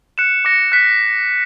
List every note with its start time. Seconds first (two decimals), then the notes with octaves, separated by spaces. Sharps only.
0.18 F#6 C#7 E7
0.45 D6 A#6 C#7
0.72 F#6 B6